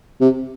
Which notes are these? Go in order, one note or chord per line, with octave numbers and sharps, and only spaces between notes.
C3